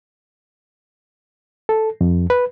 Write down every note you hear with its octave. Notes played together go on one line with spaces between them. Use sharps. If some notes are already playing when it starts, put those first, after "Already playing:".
A4
F2
B4